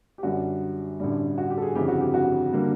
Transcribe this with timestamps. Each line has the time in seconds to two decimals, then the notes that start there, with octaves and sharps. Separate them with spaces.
0.18 G4
0.23 F#2 D3 G3 F#4
1.00 A1 G2 D3 G3
1.38 F#4
1.50 G4
1.57 A4
1.62 G#4
1.75 G1 F2 C#3 E3 G4
1.88 F#4
2.00 G4
2.14 F#4
2.53 D3 G3 A#3